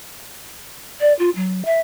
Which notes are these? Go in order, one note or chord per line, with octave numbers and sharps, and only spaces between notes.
D5
F4
F#3
E5